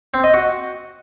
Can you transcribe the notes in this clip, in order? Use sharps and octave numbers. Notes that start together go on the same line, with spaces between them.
C4
D#5
F#4